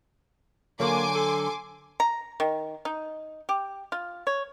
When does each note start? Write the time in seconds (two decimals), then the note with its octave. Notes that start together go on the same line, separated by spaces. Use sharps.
0.80 D3 F#3 A#3 G#5 C6 D6
1.15 A4
2.00 A#5
2.40 D#3
2.85 D#4
3.49 G4
3.92 F4
4.27 C#5